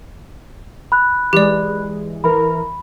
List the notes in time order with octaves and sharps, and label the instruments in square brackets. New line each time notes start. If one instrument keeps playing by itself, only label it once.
[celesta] B5 F#6
[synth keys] E3 G#3 [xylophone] G4 D5
[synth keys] E3 A#4 [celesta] B5